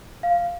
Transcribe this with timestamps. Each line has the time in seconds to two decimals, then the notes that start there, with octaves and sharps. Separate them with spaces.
0.23 F5